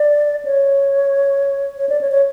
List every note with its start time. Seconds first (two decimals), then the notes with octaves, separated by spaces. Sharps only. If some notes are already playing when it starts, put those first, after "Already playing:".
Already playing: D5
0.45 C#5
1.78 C#5
1.89 D5
2.01 C#5
2.11 C#5